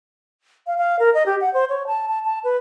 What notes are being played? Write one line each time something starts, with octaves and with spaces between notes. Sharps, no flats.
F5
F5
A#4
D#5
G4
F#5
C5
C#5
A5
A5
A5
B4